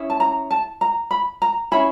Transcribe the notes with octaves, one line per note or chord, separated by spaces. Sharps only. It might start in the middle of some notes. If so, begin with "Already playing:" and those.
Already playing: C#4 E4 G#4
A5
A#5
A5
A#5
B5
A#5
C#4 E4 G#4 B5